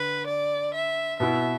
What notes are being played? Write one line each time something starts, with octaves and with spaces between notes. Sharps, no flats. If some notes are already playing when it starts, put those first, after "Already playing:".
Already playing: D3 B4
D5
E5
B2 B3 E4 E5